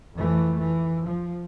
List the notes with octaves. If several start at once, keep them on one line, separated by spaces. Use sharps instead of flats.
F2 E3 A3
E3
F3